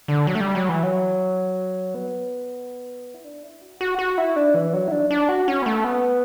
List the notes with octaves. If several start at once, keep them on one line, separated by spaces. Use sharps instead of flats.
D3
F#3
A3
G3
F#3
E3
F#3
B3
E4
D4
E4
F#4
F#4
F#4
E4
D4
E3
F#3
E4
D4
D4
F#4
C#4
B3
A3
B3